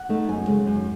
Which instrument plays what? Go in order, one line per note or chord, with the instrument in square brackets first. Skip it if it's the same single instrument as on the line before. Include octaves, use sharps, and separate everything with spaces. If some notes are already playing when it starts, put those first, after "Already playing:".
Already playing: [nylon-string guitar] F#5
A3 D#4
F#2 G#5
C#3 G#3
F#2